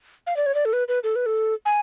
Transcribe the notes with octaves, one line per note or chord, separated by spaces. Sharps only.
F5
D5
C#5
D5
A4
B4
B4
A4
B4
A4
G#5